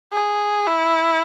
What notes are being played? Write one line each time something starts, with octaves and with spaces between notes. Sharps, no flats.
G#4
E4